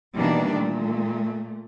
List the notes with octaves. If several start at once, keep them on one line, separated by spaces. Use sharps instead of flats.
B2 D#3 E3 G3 A#3 D4
A#2 A3